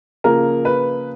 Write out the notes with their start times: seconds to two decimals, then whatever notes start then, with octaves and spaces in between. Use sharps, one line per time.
0.24 C#3 F3 A#3 A#4
0.65 B4